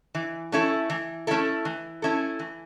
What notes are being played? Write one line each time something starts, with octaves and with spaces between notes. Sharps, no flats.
E3
A3 C#4 E4 A4
E3
A3 C#4 E4 A4
E3
A3 C#4 E4 A4
E3